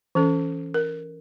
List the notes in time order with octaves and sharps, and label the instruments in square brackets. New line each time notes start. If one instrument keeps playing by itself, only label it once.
[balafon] E3 C#4 A4
A#4